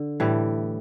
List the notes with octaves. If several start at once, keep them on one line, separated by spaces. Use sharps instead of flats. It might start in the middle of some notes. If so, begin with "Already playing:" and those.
Already playing: D3
A2 E3 G3